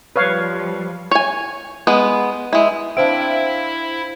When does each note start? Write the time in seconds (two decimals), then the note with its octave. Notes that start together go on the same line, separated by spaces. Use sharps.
0.16 F3 G3 B4 C#5 F5
1.11 C#5 G#5
1.87 G#3 B3
2.53 G#3 E4
2.97 C4 D4 E4 C5 E5 F5 D7